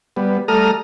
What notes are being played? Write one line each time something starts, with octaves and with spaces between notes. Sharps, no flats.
G3 B3
G3 A3 A4 A#5 D#6 F6